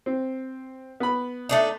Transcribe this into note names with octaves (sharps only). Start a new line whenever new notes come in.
C4
B3 B5
A3 D4 D#4